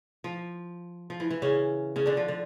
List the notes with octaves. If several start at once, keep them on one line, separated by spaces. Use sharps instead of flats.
F3
F3
E3
E3
C#3 C#4
C#3 C#4
D3 D4
F3
D3